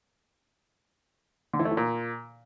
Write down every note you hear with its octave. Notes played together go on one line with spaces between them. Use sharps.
D3
E3
A3
E3
A#2